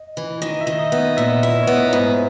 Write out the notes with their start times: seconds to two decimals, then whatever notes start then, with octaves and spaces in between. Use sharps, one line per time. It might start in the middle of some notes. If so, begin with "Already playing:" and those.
Already playing: D#5
0.17 E3
0.42 D#3 D#5
0.61 E5
0.67 D#3
0.79 D#5
0.92 B3
1.17 A#2 E5
1.43 E4 E5
1.63 C#5
1.67 B3 D#5
1.89 D#4
1.93 G#2 E4